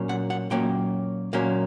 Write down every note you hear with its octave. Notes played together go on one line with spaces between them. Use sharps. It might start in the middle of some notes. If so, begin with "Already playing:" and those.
Already playing: A#2 F#3 A#3 C#4
F#5
F#5
A#2 F#3 A#3 C#4 G5
A#2 F#3 A#3 C#4